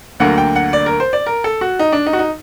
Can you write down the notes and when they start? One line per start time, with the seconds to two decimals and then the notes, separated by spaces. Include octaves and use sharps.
0.20 D2 D3 F#3 A#3 F#5
0.38 G5
0.56 F#5
0.73 D5
0.86 A#4
1.00 C5
1.13 D5
1.26 A#4
1.44 A4
1.61 F#4
1.79 D#4
1.92 D4
2.06 D#4
2.13 F#4
2.19 D#4